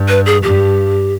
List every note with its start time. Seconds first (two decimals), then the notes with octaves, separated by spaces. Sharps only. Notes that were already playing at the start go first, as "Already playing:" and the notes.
Already playing: G2
0.09 B4
0.26 G#4
0.43 G2 G4